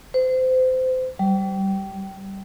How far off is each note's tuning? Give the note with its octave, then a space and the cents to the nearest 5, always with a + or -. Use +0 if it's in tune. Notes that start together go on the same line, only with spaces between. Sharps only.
C5 -25
G3 -20